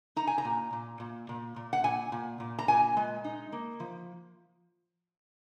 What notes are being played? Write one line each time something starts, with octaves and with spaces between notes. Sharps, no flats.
D#4 A#5
G#5
A#5
A#2
A#2
A#2
A#2
A#2
F#5
A#2 G#5
A#2
A#2
A#5
A#2 G#5
G#3
D#4
A#3
F3